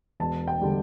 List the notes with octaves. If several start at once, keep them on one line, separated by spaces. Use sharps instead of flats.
E1 A5
G5
D3 G3